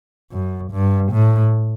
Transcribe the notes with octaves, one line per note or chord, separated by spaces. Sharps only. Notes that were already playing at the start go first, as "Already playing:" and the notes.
F#2
G2
A2